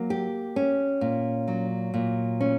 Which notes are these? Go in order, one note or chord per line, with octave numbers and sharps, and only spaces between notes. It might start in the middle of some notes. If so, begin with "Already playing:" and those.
Already playing: F#3 A#3
G4
C#4
A#2
F#3
A#2
C#4